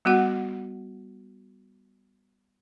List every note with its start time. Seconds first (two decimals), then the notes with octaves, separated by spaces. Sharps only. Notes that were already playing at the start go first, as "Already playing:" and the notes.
0.05 G3 B3 F#4 F#5